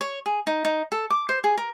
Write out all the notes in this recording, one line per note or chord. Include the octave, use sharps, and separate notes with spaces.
C#5
G#4
D#4
D#4
A4
D6
C5
G#4
A#4